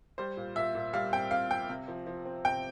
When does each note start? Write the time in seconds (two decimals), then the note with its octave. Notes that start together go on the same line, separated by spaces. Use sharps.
0.18 G3 C5
0.37 A#2
0.56 A#2 E5
0.75 A#2
0.94 G3 F5
1.13 C4 G5
1.31 C4 F5
1.50 C4 G5
1.69 C3
1.88 F3
2.07 F3
2.25 C4
2.45 C3 G5